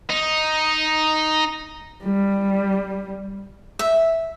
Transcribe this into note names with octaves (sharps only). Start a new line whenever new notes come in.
D#4
G3
E5